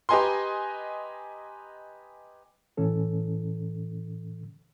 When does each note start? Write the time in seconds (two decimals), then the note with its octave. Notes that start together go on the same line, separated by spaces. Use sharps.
0.09 G4 B4 D#5 G#5 A#5 C6
2.77 A2 E3 C#4 A4